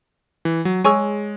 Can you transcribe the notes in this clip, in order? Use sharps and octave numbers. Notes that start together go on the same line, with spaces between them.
E3
F#3
G#3 G#4 C#5 G#5 C#6 E6